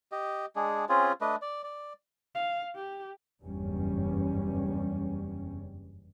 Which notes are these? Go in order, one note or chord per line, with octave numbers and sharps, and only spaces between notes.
G4 D#5
G#3 D4 G#4
C4 C#4 F4 G#4
A3 D4 B4 D#5
D5
D5
F5
G4
F#1 E2 G2 G3 C#4